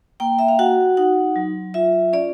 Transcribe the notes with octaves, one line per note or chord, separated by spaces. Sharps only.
A#3 G5
E5
F5
F#4 F#5
D#4 F#5
F#3
F4 E5
C#4 D5